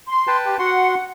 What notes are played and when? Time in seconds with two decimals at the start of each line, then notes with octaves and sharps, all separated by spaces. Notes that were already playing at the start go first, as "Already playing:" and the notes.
0.08 C6
0.27 B4 G5 A5
0.45 G4
0.59 F#4 F#5 C6